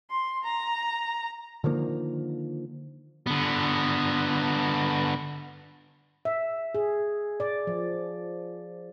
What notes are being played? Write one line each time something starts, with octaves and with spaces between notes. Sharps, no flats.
C6
A#5
D3 D#3 F3 A#3
D3 B3
E5
G#4
D5
F3